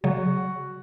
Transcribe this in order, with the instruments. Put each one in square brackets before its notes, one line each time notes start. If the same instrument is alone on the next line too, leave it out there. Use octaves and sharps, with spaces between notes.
[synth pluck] C#3 F#3 [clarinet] F#4